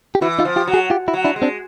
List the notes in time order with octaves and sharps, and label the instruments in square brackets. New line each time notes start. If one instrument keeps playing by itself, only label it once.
[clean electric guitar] G4
[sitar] E3 [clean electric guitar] E4 F#4
[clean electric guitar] D#4 F4
[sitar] F3
[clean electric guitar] F4 G4
[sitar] F#3
[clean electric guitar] F#4 G#4
F4 G4
E4 F#4
[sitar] F#3
[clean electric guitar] D4 E4
[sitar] G#3
[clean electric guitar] C4 D4